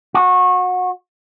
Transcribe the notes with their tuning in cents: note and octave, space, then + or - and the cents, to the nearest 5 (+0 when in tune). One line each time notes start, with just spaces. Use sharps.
F#4 -25